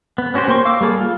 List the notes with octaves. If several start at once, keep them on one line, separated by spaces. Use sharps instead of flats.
B3
B3 C#4 F#4 G4 C5
A#3 C5 G5 C6 C#6
F5 D6 E6
G3 A#3 G#4 A4
F4